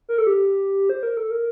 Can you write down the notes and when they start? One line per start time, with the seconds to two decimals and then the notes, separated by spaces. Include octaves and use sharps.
0.09 A#4
0.18 A4
0.27 G4
0.90 C5
1.03 A#4
1.17 A4
1.31 A#4